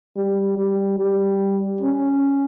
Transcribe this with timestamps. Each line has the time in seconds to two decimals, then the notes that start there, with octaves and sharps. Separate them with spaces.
0.16 G3
0.58 G3
0.99 G3
1.81 C#4